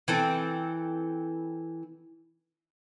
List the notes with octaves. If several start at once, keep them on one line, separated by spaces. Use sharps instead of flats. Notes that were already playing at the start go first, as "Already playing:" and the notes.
E3 C4 A4